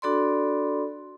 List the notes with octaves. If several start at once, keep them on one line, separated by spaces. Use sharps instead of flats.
D4 F#4 A4 D5 B5 C6